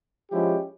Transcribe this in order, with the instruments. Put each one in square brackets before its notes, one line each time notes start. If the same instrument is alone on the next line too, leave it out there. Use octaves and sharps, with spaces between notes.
[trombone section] F3 G#3 C#4 E4 G4